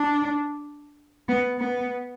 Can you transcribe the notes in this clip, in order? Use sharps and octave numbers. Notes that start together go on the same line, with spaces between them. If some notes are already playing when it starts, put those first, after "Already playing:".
Already playing: D4
B3
B3